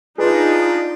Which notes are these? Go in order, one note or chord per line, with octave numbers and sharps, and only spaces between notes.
D4 D#4 F4 G#4 B4